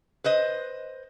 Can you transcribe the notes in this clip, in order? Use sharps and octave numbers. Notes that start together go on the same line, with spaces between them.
B4 C5 D#5